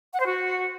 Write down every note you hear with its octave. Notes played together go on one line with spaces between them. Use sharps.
F#5
C5
F#4